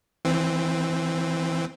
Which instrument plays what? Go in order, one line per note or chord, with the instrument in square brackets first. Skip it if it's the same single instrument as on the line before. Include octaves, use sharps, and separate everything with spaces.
[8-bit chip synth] E3 C4